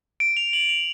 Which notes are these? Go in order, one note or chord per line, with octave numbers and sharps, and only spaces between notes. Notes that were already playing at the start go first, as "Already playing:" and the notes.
D7
F7
F#7
F7